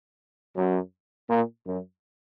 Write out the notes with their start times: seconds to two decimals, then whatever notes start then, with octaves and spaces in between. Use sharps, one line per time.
0.56 F#2
1.29 A#2
1.67 F#2